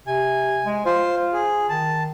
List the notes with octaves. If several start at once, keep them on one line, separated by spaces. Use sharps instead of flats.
C3 G#5
G#3
F4 C5
G#4
D#3 A5